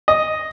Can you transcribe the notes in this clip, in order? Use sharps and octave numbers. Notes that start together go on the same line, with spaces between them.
D#5